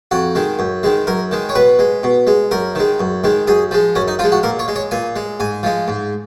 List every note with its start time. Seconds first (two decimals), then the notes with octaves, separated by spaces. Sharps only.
0.11 F2 F#4
0.35 D#3 G#3
0.59 F#2
0.83 D#3 G#3
1.07 F#2 A#4
1.31 D#3 G#3
1.49 C#5
1.55 B2 B4
1.79 G#3
2.03 B2
2.27 G#3
2.51 F#2 A#4
2.75 D#3 G#3
3.00 F#2
3.24 D#3 G#3
3.48 F#2 G#4
3.71 F3 G#3
3.95 F#2 C#4
4.08 D#4
4.19 F3 F4
4.24 G#3
4.32 F#4
4.43 A#2 A#4
4.59 C#5
4.68 G#3
4.76 C#5
4.91 A#2 G#5
5.16 G#3
5.40 G#2 G#5
5.63 F3 G#3
5.88 G#2